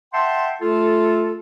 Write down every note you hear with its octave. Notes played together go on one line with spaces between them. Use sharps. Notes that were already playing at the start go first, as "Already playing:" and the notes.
E5 F#5 G5 A5 C6
A3 F4 A4